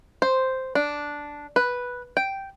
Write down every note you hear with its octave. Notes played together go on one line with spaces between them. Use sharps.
C5
D4
B4
G5